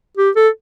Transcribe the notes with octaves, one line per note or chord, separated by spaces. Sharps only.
G4
A4